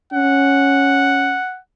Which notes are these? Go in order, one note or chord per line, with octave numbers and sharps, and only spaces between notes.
C#4 F#5